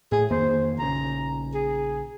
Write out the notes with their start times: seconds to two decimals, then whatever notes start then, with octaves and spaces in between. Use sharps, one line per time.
0.12 A2 G#4
0.31 F2 D#3 A#3 C5
0.79 A#1 C#3 A#5
1.54 G#4